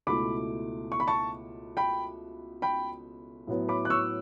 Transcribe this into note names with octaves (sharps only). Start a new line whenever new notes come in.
C#2 B2 A3 E4 B5 D6
C#6
B5
A5 C#6
G5 B5
G5 B5
A2 F#3 B3 E4
B5 D6
F#6
C#6 E6